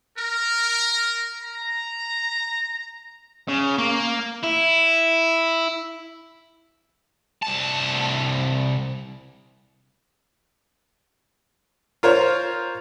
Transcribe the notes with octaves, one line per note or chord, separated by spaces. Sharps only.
A#4
A#5
C#3
A#3
E4
C2 A5
F4 A#4 C5 C#5